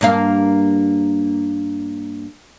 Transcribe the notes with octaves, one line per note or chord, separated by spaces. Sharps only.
G2 A#3 F5